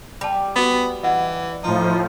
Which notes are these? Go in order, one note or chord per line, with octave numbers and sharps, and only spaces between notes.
G3 A5 B5
B3 F#4 B5
E3 D#5 F#5
A2 F3 D#4